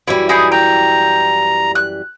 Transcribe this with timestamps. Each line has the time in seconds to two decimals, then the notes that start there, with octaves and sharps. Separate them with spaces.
0.07 F#2 E3 G3 E4
0.29 D#4 E4 G#4
0.52 G5 A#5
1.75 F#6